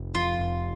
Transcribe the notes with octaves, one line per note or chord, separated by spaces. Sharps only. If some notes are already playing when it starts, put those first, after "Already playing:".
Already playing: F1
F2 F4
F1